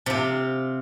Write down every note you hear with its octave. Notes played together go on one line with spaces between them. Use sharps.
C3 F4